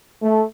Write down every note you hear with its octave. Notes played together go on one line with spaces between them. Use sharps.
A3